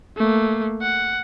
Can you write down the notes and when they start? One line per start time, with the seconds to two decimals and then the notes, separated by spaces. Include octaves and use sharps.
0.17 A3 A#3
0.82 F#5